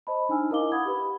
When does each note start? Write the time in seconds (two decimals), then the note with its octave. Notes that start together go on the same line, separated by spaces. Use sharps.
0.07 C5 D#5 A5 B5
0.29 D4 D#4 G#5 E6 F6
0.50 E4 A#4 D#5 F5 D6 G7
0.72 F#5 B5 D#6 G#6
0.85 G4 B4 B5